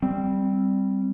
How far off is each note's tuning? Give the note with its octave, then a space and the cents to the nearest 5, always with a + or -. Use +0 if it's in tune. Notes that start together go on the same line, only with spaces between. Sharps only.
G3 +0 C4 +0